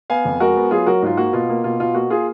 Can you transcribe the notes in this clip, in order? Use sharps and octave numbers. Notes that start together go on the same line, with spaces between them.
B3 F5 G#5
F2
G#3 F#4 A#4
B3
F#3 F4 G#4
F#3 F#4 A#4
G#2 F4
A#3 F#4
B2 F4
A#3
B2 F4
B2 F4
A#3 F#4
F4 G#4